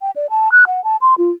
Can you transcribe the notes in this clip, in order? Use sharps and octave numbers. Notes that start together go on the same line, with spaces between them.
G5
D5
A5
F#6
F#5
A5
C6
F4